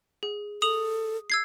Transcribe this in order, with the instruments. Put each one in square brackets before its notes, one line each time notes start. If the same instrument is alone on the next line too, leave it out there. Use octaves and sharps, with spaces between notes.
[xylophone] G#4
[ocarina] A4 [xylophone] D#6 F7 F#7
[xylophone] E6 G#6 C7